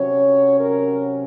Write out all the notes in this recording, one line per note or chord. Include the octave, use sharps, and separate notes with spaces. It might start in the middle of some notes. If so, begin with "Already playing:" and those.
Already playing: C3 F#3 C#4 C#5
A#4